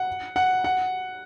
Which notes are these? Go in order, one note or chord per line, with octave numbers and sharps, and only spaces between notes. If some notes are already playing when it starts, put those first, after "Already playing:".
Already playing: F#5
F#5
F#5